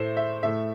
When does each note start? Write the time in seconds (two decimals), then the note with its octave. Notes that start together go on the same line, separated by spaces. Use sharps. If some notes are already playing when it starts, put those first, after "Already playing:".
Already playing: A2 A3 C5 E5
0.17 E5
0.43 A2 A3 E5